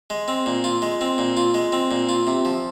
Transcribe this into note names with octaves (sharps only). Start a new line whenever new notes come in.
G#3
C4
A#2
F4
G#3
C4
A#2
F4
G#3
C4
A#2
F4
C3
F3